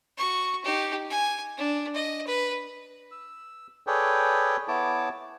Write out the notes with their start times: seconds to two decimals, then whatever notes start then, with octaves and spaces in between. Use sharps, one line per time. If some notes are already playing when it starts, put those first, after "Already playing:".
0.18 F#4 C#6
0.64 D#4 G4
1.10 G#5
1.58 D4
1.94 D#5
2.27 B4
3.11 E6
3.87 G#4 A4 B4 C#5 D5 G5
4.68 B3 E4 C#5 A5 D6